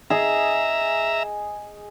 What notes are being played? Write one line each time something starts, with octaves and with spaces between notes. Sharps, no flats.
G#4 D#5 E5 A#5